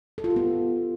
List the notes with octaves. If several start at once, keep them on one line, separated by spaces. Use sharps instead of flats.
A4
F4
G4
B3